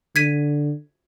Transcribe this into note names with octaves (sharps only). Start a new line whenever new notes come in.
D3 G#6 B6 D#7